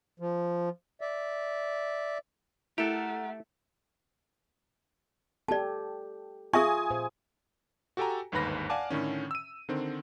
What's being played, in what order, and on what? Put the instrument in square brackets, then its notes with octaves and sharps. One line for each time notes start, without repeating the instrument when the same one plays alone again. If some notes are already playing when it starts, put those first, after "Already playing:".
[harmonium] F3
D5 E5
[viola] A3 [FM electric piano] E4 E5 [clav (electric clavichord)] G4 A4 [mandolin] A#4 F#5
[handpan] G4 A4 [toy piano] D5 A5
[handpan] F4 [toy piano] G#4 E5 C#6 [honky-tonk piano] G#5 D#6
[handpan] A#2 C5
[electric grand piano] F#4 G4 A4 G5 G#5 A#5
G1 D#2 G#2 B4 B5 A#6
D5 F5 F#5 G#5 A5 D6
A2 D3 D#3 C#4
E6 D#7
D3 D#3 C4